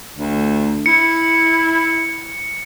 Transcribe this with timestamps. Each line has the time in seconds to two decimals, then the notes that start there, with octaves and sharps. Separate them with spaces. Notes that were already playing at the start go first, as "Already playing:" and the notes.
0.16 D2
0.86 E4 C#7